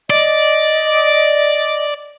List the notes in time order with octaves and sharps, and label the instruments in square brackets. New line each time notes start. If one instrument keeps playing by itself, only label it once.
[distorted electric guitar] D5 [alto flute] D#5